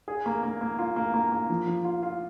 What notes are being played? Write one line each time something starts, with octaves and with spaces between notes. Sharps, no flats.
G#4
A#3
A#3
A#3
F4
A#3
A#3
A#3
F3
F3
F4
F4